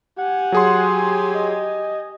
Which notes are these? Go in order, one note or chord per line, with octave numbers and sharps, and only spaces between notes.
G4 F#5 G#5
F#3 G#4 C6
D#5